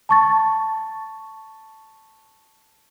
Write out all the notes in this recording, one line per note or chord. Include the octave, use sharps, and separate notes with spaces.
A5 C#6 A6